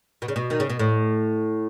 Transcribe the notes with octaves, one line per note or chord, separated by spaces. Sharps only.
B2
C#3
B2
D#3
C#3
B2
A2